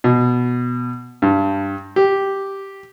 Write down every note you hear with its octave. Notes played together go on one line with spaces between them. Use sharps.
B2
G2
G4